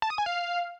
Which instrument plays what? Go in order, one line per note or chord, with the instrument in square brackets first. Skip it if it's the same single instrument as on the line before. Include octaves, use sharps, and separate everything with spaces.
[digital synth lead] A5
D#6
G#5
F5